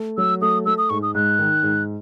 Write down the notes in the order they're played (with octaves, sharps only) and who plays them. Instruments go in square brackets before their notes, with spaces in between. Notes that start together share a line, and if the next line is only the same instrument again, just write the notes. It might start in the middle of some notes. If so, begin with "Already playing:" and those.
Already playing: [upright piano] A3
[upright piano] F#3 [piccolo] E6
[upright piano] A3 [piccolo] D#6
[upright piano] A3 [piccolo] E6
[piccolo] D#6
[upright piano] G#2 [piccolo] C#6
[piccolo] D#6
[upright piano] G#2 [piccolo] F#6
[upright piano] D#3
G#2